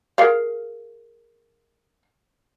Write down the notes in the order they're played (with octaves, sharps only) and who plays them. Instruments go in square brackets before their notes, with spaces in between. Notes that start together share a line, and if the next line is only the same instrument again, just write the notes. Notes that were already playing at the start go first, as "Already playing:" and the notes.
[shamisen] G#4 A#4 F5